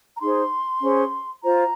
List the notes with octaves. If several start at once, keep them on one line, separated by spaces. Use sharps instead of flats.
A#5
D#4 G#4 C5 C6
C#4 G#4 C5
F4 C5 A#5